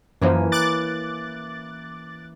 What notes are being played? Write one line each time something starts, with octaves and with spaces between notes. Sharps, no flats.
F#2 E3 F3 A#3 C#4
D6 F#6 A6